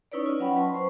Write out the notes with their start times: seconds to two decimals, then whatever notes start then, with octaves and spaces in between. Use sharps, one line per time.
0.12 C#4 D#4 E4 B4 C#5 D5
0.26 F4 D#5
0.40 F#3 C#4 F#5 G5 B5
0.56 B4 A5 C6 C#6
0.74 C5 C#6